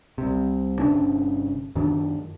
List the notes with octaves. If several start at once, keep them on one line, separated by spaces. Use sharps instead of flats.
C2 C3
G1 C3 C#4 D4
F#2 D#3 D4